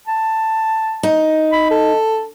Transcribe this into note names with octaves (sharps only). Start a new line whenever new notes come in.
A5
D#4
B5
A4